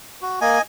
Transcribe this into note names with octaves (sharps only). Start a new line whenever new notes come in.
F#4
A#3 D#5 G#5